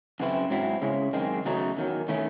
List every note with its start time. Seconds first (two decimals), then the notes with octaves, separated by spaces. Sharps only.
0.20 F#2 C#3 E3 C4 E4
0.50 G#2 F#3 C4 E4
0.82 C#3 G#3 C#4 E4
1.13 F#2 D#3 G#3 C4
1.46 E2 C#3 F#3 A3 D#4
1.77 E2 D#3 F#3
2.08 D#3 A3 C#4 E4